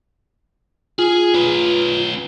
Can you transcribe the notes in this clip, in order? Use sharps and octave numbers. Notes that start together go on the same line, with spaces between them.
F4 G#4
C#4 B4